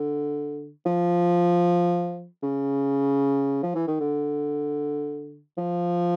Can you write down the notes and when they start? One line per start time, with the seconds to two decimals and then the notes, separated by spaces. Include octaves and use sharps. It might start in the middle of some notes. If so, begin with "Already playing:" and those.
Already playing: D3
0.86 F3
2.43 C#3
3.63 F3
3.75 E3
3.88 D#3
4.00 D3
5.58 F3